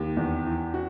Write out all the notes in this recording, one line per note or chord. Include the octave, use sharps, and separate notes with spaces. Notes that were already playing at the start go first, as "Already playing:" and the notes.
Already playing: D#2 G4
E2
E3
F#4